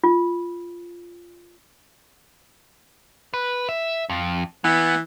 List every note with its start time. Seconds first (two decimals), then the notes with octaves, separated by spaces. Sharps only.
0.04 F4
3.34 B4
3.69 E5
4.10 F2
4.64 E3 B3